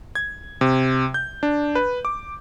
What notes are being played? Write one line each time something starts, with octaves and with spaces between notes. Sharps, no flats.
G#6
C3
G6
D4
B4
D6